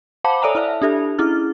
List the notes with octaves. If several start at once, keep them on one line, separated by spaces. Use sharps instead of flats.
C5 F5 F#5 A5 B5 D6
A4 C#5 D5 E5 G#5 A#5
E4 D5 E5 A5
D4 G4 A4 E5
C#4 E4 G#4 F6